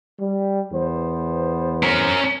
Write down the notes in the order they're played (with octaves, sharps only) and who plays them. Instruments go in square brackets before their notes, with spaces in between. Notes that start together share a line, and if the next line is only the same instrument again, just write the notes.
[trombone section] G3
E2 B3 C5
[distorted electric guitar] C#4 A#4